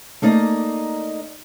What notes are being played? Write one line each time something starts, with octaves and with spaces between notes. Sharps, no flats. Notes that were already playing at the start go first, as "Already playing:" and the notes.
A3 A#3 D#4 D5 D#5